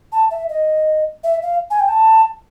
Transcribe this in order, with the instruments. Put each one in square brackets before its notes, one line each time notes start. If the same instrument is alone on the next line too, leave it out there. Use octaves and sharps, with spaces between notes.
[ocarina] A5
E5
D#5
E5
F5
G#5
G5
A5